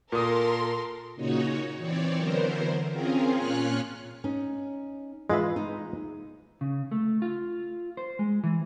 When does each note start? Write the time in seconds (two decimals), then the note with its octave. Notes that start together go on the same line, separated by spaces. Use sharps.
0.12 A#2 A4 A#4 C6 D#6
1.15 A#2 C#3 D#4 F#4 C#5
1.77 E3 C4 C#5 D5
2.16 D3 E3 F#3 B3 A#4 C5
2.89 C4 C#4 F4 G#4 A#4
3.34 A#2 C#4 F4 C#5 F6 F#6
4.24 C#4 D#4
5.30 E3 G#3 F4 B4 E5
5.56 D#4
6.61 C#3
6.91 A3
7.22 F4
7.97 C5
8.19 G#3
8.44 E3